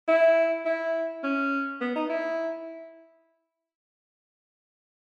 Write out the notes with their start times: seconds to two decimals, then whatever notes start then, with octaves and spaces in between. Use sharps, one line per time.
0.08 E4
0.65 E4
1.23 C#4
1.81 B3
1.95 D#4
2.09 E4